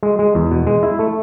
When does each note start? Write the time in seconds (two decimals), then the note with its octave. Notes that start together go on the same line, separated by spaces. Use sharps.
0.03 G#3
0.19 G#3
0.35 E2
0.51 B2
0.67 G#3
0.83 E4
0.99 A3